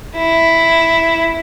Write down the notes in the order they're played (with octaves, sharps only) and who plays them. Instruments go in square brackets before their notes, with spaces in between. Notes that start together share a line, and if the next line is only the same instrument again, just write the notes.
[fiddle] E4